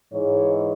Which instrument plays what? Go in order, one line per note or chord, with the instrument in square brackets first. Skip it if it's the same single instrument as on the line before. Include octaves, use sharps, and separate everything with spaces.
[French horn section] G#2 E3 G#3 C#5